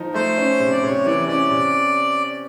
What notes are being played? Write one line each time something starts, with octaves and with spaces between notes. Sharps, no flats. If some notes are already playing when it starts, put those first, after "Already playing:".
Already playing: F3 D#4
A3 C5
C#4
C3
D5
C3 C#5
E3 D5
C#4 D5
C3